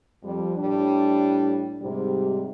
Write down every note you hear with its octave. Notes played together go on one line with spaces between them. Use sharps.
F2 G3
A2 G3 D4
G#2 C3 G3